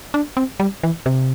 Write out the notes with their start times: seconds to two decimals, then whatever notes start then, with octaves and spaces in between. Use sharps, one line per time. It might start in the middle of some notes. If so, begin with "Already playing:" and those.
0.14 D4
0.37 C4
0.60 G3
0.83 E3
1.06 C3